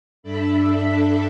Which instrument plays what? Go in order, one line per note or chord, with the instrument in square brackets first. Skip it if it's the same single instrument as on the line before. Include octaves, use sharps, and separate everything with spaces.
[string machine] G2 D4 A4 E5 B5